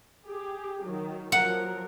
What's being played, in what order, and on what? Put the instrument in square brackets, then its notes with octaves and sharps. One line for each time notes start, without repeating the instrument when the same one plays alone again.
[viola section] G4 G#4
D#3 F#3
[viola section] F3 F#3 A#4 [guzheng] F#5